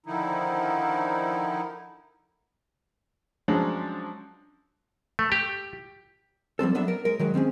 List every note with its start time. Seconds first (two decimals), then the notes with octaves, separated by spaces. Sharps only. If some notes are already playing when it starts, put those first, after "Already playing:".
0.06 D3 D#3 F3 D#4 E4
3.48 F3 F#3 G#3 C#4 D4
5.19 A3
5.32 G4
6.59 F3 G3 C4 A4
6.75 F#3 B3 D4 A4 E5
6.88 A#4
7.05 G#3 A#4
7.19 D#3 F#3 G#3
7.34 D#3 C4 C#4 G#4